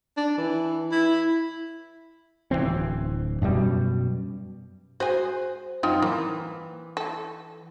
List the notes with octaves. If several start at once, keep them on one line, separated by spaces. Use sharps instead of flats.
D4
E3
E4
D1 F2 E3 C4
F#2 B2 G3
F#4 G#4 C5
F#2 C4 D#4 F4
E3 A#3
A4